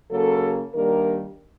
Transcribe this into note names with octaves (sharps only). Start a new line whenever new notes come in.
C#3 F#3 A#3 A4
D#3 G3 A#3 D4 A#4